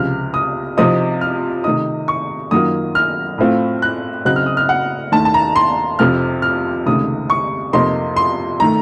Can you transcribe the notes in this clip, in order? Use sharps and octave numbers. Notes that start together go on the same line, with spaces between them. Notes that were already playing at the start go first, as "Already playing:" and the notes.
Already playing: C#2 C3 F3 F6
D#6
C3 F3 C4 D#4 D#6
F6
C3 D#3 A3 D#4 D#6
C#6
F#2 D#3 F#3 A#3 F4 D#6
F6
A2 A3 C4 F4
F#6
C#3 F#3 C4 D#4 F#6
F6
D#6
F6
F#5
D#2 D#3 A3 A5
A5
A#5
C6
F2 C3 F3 C4 F6
F6
C#2 C3 D#3 A3 D#6
C#6
F2 C3 F3 A#3 D#4 C6
C6
D#3 A3 A#5